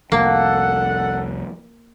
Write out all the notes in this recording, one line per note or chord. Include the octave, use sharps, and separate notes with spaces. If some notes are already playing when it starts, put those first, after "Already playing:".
C2 F2 A#3 A4 F#5